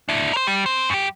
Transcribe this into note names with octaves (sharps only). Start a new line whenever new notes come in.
D4 E4
A#4 C5
G3
C4 C5
F#2 G4